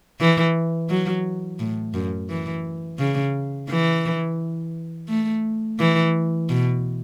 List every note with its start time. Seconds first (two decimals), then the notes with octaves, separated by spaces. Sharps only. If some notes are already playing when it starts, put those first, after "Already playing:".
0.20 E3
0.89 F#3
1.59 A2
1.94 F#2
2.29 E3
2.99 C#3
3.69 E3
5.09 A3
5.79 E3
6.49 B2